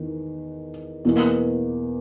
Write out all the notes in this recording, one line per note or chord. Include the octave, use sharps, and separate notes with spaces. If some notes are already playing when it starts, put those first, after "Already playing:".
Already playing: E2 D#3
E2 B2 A#3